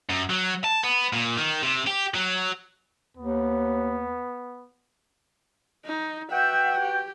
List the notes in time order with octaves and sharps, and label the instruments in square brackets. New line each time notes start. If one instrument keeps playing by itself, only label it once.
[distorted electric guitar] F#2
F#3
A5
B3
A#2
D#3
C3
G4
F#3
[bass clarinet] D#2 [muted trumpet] B3
[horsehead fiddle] D#4
[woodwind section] F#4 B4 G5 [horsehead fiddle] E5 F#5
[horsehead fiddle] G4